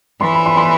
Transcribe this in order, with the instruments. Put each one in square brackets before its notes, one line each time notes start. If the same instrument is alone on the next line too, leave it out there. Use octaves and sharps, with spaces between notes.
[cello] E3 [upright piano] C6
[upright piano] B5
C6
C6